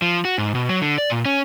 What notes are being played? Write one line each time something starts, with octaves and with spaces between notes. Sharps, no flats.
F3
F#4
G#2
B2
F#3
D3
D5
A#2
C#4